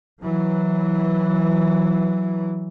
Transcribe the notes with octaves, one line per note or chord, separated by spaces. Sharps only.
E3 F#3